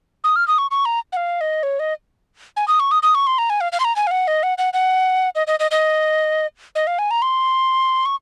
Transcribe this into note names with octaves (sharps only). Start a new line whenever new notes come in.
D#6
F6
D#6
C#6
C#6
A#5
F#5
F5
D#5
C#5
D#5
G#5
D#6
C#6
D#6
D#6
C#6
C6
A#5
G#5
F5
F5
C6
A#5
G#5
F5
F#5
D#5
F#5
F#5
F#5
D#5
D#5
D#5
D#5
D#5
F5
G#5
A#5
C6
C#6